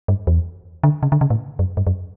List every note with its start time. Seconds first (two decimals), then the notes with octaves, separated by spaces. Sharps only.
0.08 G2
0.27 E2
0.83 D3
1.03 C#3
1.12 D3
1.21 C#3
1.30 A2
1.59 F#2
1.77 G2
1.87 F#2